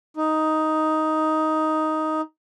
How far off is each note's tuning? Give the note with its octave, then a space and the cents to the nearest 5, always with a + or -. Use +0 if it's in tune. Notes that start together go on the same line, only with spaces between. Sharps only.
D#4 +5